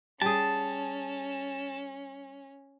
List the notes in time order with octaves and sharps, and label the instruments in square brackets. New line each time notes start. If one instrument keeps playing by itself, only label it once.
[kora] G3 G#4 [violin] C#4 [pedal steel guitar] A5